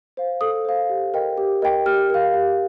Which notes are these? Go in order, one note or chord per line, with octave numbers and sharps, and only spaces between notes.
C5 F5
A4 D#6
C5 F5
G4
A#4 D#5 G5
G4
A#4 D#5 G5
G4 F6
A#4 F5
G4